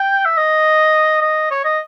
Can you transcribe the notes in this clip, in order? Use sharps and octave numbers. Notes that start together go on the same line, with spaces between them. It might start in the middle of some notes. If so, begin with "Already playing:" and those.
Already playing: G5
E5
D#5
D#5
C#5
D#5